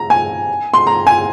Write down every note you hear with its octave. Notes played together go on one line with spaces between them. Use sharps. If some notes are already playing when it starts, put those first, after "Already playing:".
Already playing: A#5
G#5
C6
A#5
G#5